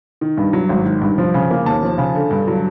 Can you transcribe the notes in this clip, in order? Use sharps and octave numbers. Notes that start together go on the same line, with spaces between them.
D#3
G2
F#3
G#1
D#3
G2
F3
C#3
A#3
D#2 A5
F3
C#3
D3
G2
F#3